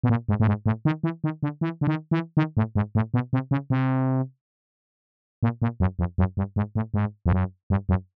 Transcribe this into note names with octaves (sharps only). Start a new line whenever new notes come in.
B2
A#2
G#2
A2
G#2
A2
D#3
E3
D#3
D3
E3
D3
D#3
E3
D#3
A2
G#2
A2
B2
C3
C#3
C3
A#2
A#2
F#2
F2
F#2
G2
G#2
A2
G#2
F2
F#2
G2
F#2